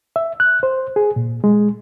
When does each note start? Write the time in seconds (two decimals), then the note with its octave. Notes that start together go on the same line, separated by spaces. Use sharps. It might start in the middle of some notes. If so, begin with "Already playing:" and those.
0.16 E5
0.40 F#6
0.63 C5
0.96 G#4
1.16 A#2
1.44 G#3